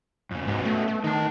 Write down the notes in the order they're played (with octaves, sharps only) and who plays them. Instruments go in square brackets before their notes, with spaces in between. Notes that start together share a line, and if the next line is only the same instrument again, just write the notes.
[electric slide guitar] F2 C#3
[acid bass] G#2 [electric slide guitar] B3 C#4 F#4
[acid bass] A3
A3
[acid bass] D#3 [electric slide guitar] D#4 A5